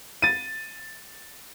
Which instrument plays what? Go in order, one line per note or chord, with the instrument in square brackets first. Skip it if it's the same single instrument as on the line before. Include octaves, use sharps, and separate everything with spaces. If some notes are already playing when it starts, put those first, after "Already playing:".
[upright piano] A6 D#7